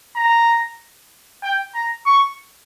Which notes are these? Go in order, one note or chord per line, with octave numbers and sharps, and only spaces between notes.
A#5
G5
A#5
C#6